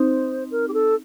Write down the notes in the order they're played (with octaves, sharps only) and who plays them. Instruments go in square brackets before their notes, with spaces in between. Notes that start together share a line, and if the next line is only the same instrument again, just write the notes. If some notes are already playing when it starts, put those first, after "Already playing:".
Already playing: [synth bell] C4 D#4 [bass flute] C5
[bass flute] A#4
G4
A4